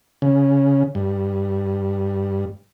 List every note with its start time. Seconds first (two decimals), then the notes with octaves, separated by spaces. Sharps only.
0.22 C#3
0.95 G2